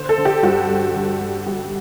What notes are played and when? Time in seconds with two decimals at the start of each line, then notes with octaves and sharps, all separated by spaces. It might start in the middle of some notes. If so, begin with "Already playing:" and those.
Already playing: D3 C5
0.09 A4
0.18 D3
0.25 G4
0.43 G2 F#4
0.69 G2
0.95 D3
1.20 G2
1.46 G2 G4